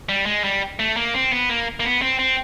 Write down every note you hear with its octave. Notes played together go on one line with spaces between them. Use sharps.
G3
G#3
G3
A3
A#3
C4
B3
A#3
A#3
B3
C4
C4